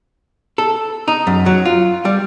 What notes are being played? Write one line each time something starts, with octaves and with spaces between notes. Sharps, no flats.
A4
D#4
F#2
F#3
F4
G3